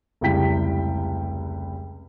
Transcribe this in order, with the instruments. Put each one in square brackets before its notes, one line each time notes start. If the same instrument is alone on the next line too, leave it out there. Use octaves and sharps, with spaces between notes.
[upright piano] F1 C#2 G3 E4 G5 B6